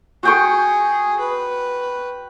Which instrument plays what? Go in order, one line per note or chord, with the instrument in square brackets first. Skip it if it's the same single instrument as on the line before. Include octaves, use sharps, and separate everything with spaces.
[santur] F#4 G5 C#6 [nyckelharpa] G#4
[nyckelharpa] B4